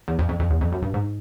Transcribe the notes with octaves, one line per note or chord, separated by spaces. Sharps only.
E2
F2
F2
F2
E2
F2
F#2
G2
G#2